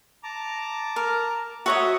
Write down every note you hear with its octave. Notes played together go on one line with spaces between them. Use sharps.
A5 A#5 D6
A#4
F#4 C#5 D#5 E5